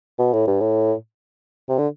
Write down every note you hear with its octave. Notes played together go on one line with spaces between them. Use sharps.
B2
A2
G2
A2
C3
D3